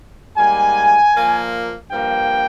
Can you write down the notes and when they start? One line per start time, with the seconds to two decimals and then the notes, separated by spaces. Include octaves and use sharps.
0.37 G#2 G3 A#3 G#5
1.14 A#2 F3 A#3
1.90 G2 F3 A#3 G5